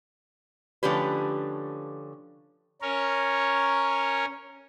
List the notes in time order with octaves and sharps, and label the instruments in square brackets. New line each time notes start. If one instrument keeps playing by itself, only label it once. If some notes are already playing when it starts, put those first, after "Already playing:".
[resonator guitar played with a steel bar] D3 F3 A3 C#4 G4 B4
[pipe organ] C#4 A#4 C#5